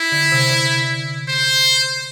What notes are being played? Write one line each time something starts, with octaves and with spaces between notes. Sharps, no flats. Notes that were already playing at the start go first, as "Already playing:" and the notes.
Already playing: E4
D3
C3
D3
C5